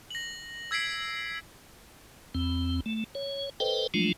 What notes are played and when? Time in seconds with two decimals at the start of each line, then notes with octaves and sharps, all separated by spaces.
0.11 A#6 F#7
0.71 E6 G#6 B6 C7 D7
2.35 E2 C4
2.86 A3
3.15 C#5
3.60 A4 B4 C5 D#5 G5
3.94 F3 F#3 G#3 A3 D4 F4